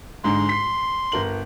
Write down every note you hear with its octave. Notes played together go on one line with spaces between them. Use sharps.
G#2 D3 G#3 C6
B6 C7
G1 A#4 F#7